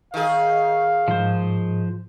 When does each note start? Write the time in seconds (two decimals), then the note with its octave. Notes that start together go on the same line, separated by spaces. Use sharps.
0.14 D#3 G#4 F5
1.08 G#2 F3 C5